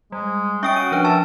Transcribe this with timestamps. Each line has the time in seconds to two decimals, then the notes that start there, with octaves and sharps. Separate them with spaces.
0.12 G3 G#3
0.63 C#4 D#5 E5 G5 C#6 D7
0.76 F#4 D#7
0.92 F3 D4 B4
1.05 E5 A5